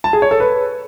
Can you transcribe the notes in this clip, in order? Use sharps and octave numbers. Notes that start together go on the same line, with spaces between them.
A5
G#4
C#5
A4
B4